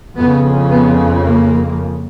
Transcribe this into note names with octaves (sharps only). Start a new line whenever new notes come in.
F2 C#3 B3
B3
A#3